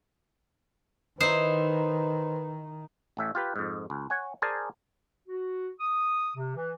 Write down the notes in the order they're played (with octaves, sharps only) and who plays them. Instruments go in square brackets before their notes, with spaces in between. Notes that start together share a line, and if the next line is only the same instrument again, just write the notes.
[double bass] D#3 [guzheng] D#4 E4 [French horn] B4 [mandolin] C5
[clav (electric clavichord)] A1 A2 E5
F4 G4 B4
F2 G#2
C#2
C#5 F#5 G#5
G#4 A#4 C5 D5 G#5 A5
[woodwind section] F#4
D#6
C3
E3